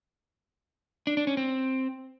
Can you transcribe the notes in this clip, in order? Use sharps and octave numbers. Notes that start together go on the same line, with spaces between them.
D4
D4
C#4
C4